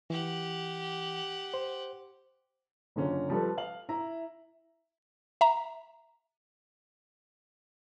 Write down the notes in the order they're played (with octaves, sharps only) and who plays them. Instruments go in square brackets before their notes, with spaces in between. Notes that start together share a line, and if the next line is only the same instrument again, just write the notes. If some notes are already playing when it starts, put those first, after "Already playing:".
[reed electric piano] E3 [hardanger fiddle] G4 F#5
[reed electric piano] C5
[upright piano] F#1 D3 C#4 F4
F3 G3 A4 B4
F5 F#7
E4 E5 A#5
[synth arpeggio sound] E5 A#5